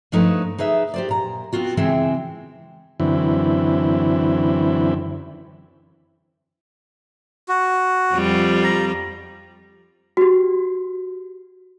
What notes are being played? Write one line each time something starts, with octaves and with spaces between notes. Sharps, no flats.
G2 F3 A3 D#4 B4 C#5
D#4 G#4 B4 E5
G4 C5 D5
A#2 A#5
B3 C4 F4 F#4
C#3 E3 G#3 C4 E5
F#2 D3 E3 C4 E4
F#4
F2 G3 F4
A#5
F#4 G4